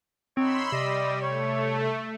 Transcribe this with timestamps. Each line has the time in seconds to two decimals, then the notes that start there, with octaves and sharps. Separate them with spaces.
0.37 D3 C4 D#4 C#5 B5 C6 E6
0.72 C3 G3 D5 D#5
1.21 A3 C#5